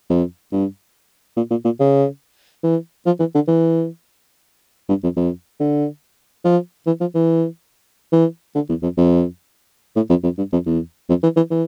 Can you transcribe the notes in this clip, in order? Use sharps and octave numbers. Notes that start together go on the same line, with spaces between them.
F2
G2
A#2
A#2
A#2
C#3
E3
F3
E3
D3
E3
G2
F2
F2
D3
F3
E3
F3
E3
E3
D3
E2
F2
F2
A2
F2
F2
G2
F2
E2
F2
E3
E3
E3